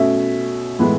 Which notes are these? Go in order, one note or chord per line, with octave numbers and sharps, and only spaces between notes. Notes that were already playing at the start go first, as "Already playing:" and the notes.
Already playing: B2 A3 C#4 E5
A2 E3 G#3 B3